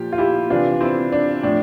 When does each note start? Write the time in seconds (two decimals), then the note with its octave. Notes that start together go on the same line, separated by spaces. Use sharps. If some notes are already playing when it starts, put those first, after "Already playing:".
Already playing: A#2 F3 G4
0.12 F4
0.18 E4 G4
0.50 C3 E3 D4 F4
0.81 C4 E4
1.12 D4
1.43 A2 F3 D4